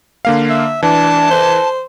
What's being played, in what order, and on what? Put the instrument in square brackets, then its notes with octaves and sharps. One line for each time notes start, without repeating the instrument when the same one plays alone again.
[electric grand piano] D3 A#3 F5
[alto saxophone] E5
[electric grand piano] E3 [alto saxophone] D4 [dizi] A5
[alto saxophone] C5